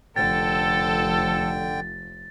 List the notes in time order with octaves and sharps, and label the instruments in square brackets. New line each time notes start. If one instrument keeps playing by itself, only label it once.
[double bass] F1 [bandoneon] D3 G5 [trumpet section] A4 [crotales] A6